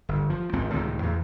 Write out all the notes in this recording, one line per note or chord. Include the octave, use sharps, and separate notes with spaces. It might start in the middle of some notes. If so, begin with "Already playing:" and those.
G1
F3
G#1 C#2 F3 C4
C#2 A2 C3 D#3
E2